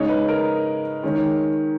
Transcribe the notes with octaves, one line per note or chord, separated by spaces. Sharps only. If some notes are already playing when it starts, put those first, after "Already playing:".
Already playing: C#3 G#3 D#4 C#5
B4
A#4
D#3 G#3 C#4